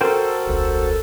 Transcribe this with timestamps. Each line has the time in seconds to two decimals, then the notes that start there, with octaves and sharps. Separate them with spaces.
0.01 F#4 A4 A#4 C5 G5
0.47 E1 C#2